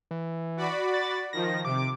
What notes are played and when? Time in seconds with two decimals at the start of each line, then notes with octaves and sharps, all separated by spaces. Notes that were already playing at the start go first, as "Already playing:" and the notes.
0.11 E3
0.57 F#4 D5 B5
0.94 A6
1.33 D#3 F3 A#6
1.65 C3 D6